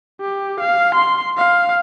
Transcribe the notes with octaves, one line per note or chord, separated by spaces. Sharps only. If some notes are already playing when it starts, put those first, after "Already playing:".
G4
F5
C6
F5